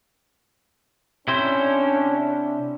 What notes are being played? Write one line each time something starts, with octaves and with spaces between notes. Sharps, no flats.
C3 C#4 D4 E4 C5